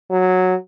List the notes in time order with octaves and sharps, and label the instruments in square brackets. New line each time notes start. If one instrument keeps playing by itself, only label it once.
[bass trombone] F#3